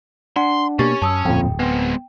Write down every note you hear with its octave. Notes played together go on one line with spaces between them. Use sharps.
D4 F#5 C6
B2 A#3 C#4 G4 C#6 A6
F#2 A5 D#6 E6
D1 F2 A#2 G5
G#3 B3 C4